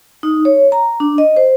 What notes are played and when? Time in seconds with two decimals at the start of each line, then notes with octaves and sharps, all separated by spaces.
0.23 D#4
0.45 C#5
0.72 A#5
1.00 D4
1.18 D#5
1.37 C5